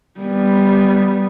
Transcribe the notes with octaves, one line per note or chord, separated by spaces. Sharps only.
G3 B3